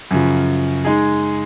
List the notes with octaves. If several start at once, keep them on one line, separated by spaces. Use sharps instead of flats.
F#2 C#3 F3
G#3 D#4 G#4